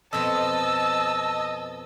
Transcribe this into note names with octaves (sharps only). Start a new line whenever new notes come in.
F2 B2 C4 D#5 A5 E6